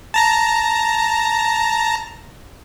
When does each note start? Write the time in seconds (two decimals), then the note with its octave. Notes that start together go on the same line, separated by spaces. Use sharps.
0.14 A5 A#5 A#6